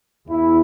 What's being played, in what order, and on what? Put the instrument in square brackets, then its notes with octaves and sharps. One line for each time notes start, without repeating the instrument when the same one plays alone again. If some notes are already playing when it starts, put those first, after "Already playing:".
[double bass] E2 [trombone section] E4